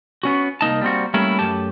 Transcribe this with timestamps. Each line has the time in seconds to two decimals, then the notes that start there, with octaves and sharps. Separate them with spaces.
0.23 B3 C#4 F#4
0.61 C2 A#3 D#4 A5
0.82 G3 A#3 C4 F#4
1.14 G3 A3 A#3 C#4 E4
1.39 F#2 A3 G4 A5